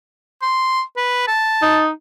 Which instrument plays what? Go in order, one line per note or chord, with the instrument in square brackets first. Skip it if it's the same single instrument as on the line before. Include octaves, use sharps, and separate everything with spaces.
[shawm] C6
B4
A5
[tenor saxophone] D#4